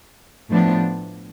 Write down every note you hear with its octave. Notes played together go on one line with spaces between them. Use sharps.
A2 F3 B3 D4